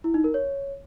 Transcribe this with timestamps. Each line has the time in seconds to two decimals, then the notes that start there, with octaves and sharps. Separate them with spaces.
0.04 E4
0.14 D#4
0.24 A#4
0.34 C#5